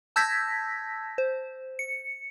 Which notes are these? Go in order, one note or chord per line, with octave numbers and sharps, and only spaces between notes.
A5 E6 G6 G#6 A#6 B6
C5
C#7